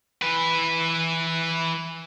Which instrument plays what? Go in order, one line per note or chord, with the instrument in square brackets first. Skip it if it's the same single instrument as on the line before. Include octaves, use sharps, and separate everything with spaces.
[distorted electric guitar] E3 B4